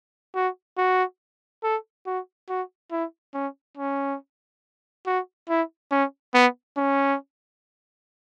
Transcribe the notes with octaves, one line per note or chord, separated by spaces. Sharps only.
F#4
F#4
A4
F#4
F#4
E4
C#4
C#4
F#4
E4
C#4
B3
C#4